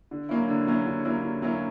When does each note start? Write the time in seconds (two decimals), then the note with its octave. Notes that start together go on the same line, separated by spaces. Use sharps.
0.11 D3
0.29 F#3 A#3 C#4 E4
0.49 D3
0.67 F#3 A#3 C#4 E4
0.86 D3
1.05 F#3 A#3 C#4 E4
1.23 D3
1.42 F#3 A#3 C#4 E4